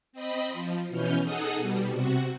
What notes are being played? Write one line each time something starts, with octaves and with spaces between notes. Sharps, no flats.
C4 D#5 B5
F3
B2 E3 C#4 F6 G6
D#4 G#4 A4 F#5 D#6
B2 G3
C3 F#4